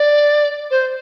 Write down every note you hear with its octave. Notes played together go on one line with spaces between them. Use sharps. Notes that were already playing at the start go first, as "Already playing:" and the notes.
Already playing: D5
C5